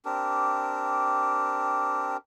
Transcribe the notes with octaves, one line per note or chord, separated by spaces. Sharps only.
C4 D4 G4 A#4